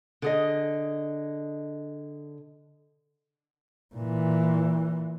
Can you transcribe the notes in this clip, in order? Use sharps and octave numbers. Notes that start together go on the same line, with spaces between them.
D3 G#4 D#5
A#2 E3